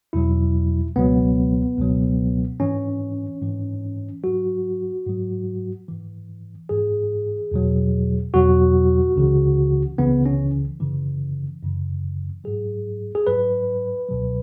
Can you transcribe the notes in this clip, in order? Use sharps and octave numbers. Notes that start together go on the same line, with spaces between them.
E2 B2 F#3 E4
C#2 B2 F#3 B3
C#2 B2 F#3
G#2 E3 C#4
G#2 E3
G#2 F#3 F#4
G#2 F#3
G#2 E3
G#2 E3 G#4
E2 B2 F#3
E2 B2 F#3 F#4
C#2 C#3 E3
C#2 C#3 E3 B3
C#4
F#2 C#3 E3
F#2 C#3 E3
G#2 F#3 G#4
G#4
G#2 F#3 B4
C#2 B2 F#3